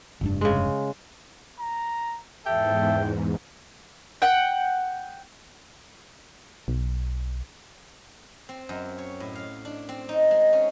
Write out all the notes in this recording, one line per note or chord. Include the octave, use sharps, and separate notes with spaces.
F1 G2 D4
C#3 G#3
A#5
E2 G#2 A4 E5 G5
F#5 G5
B1
C4
F#2
C#5
A2
F5
D4
C4
D#4
G#3
C#4